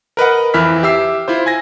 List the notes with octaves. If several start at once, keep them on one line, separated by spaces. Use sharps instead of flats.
A#4 B4 D#5 F#5
F2 E3 E5 B5 F6 B6
G4 E5 E6 C7
E4 F4 C5
G#5 G#6 A#6